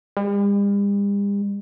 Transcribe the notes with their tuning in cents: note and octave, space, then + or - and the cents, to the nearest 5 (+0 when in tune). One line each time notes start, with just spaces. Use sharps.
G3 +45